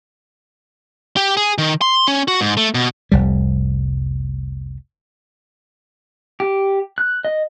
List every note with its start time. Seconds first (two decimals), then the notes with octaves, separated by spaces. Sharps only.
1.17 G4
1.37 G#4
1.58 D#3
1.81 C6
2.08 C#4
2.28 F#4
2.41 G#2
2.57 A3
2.75 B2
3.12 F1 C2 G3
6.40 G4
6.98 F#6
7.25 D#5